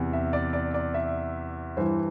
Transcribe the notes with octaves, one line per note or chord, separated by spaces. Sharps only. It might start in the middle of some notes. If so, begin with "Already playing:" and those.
Already playing: E2 C3 E3
E5
D5
D5
D5
E5
G2 E3 C5